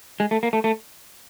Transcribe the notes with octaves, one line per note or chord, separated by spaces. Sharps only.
G#3
A3
A#3
A3
A3